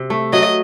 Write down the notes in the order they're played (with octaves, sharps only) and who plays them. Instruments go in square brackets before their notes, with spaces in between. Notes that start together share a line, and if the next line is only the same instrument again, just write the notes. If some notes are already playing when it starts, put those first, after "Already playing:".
Already playing: [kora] C3
A3
[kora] F#3 [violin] D#5